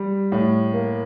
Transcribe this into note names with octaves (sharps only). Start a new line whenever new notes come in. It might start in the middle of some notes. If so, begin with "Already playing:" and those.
Already playing: G3
A2
A#3